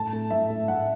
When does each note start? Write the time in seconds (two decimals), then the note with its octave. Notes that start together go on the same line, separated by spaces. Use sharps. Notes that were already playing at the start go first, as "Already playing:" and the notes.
Already playing: A2 A5
0.13 A3
0.30 A2 E5
0.50 A3
0.68 A2 F#5